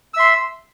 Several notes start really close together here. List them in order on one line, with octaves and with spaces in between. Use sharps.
E6 E5 C6